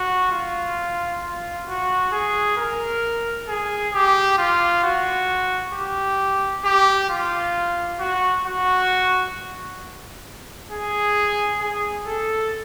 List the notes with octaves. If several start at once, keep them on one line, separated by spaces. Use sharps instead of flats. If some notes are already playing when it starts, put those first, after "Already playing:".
Already playing: F#4
F4
F4
F#4
G#4
A#4
G#4
G4
F4
F#4
G4
G4
F4
F#4
F#4
G#4
G#4
A4